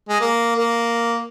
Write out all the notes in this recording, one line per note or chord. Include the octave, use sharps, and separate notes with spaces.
G#3
A#3
A#3